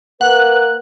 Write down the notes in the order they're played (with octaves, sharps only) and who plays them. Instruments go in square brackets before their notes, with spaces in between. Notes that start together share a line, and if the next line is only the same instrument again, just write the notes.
[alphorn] A#3 [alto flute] B4 [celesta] F#5 [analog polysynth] F#6